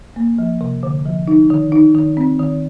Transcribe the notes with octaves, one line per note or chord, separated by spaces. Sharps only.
A#3
F3
C3
D3
F3
D#4
D#3
D#4
D#3
C4
D#3